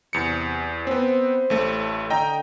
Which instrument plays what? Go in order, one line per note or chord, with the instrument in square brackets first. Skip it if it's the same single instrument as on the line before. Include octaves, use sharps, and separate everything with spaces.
[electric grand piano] E2 C#7 [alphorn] C3
[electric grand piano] B3 C4 [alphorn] C5
[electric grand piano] A1 A3
[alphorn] D3 [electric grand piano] D#5 G5 A#5